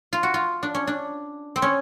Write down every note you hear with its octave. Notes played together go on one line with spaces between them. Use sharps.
F4
F#4
F4
D4
C#4
D4
C4
C#4